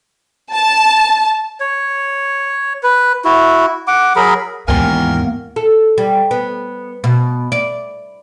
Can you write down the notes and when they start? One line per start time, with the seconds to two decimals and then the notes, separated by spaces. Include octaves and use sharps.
0.52 A5
1.60 C#5
2.83 B4
3.25 E4 F#4
3.87 F#5 D6
4.16 F#3 G#4 A#4 B5
4.68 D#2 G#2 E3 A#3 B3 A#4 G5 G#5
5.56 A4
5.98 G3
6.31 B3
7.04 B2
7.52 D5